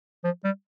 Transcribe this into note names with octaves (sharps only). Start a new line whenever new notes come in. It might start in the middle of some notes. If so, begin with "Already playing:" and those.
F3
G3